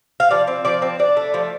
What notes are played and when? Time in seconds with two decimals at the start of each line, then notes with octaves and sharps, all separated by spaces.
0.20 F5
0.31 F3 D5
0.48 C4
0.65 F3 D5
0.82 C4
0.99 D4 D5
1.17 A3
1.34 F3